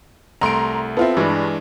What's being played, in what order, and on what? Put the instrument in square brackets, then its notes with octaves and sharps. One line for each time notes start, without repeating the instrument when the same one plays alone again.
[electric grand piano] C2 A3 D7 [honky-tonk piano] A#5 C6
[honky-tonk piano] B3 F4 E5 [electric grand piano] C4 A4
[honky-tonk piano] G2 [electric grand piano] E3 G#3 D4